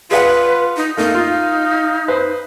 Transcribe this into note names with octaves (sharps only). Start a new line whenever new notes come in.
F4 G#4 B4 D5 F#5
D#4
A3 A#3 D#4 F5
F4
B4 C5